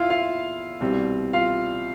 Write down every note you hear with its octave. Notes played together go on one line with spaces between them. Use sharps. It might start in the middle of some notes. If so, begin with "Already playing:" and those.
Already playing: E2 E4 F4 E5 F5
F4 F5
C2 B2 G3 C4
F4 F5